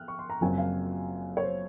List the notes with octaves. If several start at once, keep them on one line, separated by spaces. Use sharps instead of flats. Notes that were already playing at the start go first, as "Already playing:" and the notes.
Already playing: F6 F#6
C#6
C6
A#5
F#1 F#2 F3 C4 F4 G#5
F5
C#5
C5